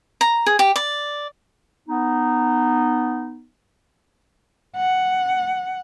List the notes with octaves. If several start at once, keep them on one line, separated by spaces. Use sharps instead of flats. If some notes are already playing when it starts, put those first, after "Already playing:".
A#5
G#4
G4
D5
B3 D#4
F#5